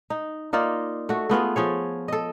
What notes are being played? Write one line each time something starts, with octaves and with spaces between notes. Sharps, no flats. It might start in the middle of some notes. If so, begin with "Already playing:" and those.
D#4
A#3 D#4 F4 D5
A3 F#4
A3 B3 F4 G#4
F3 G#4 C#5
A4 D#5